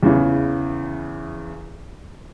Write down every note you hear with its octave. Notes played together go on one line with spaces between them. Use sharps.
E2 C#3 E3